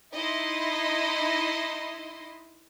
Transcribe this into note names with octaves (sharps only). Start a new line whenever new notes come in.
D#4 E4 D#5 C6